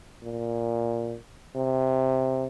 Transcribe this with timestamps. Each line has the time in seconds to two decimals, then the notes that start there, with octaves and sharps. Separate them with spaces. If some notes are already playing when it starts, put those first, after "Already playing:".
0.23 A#2
1.56 C3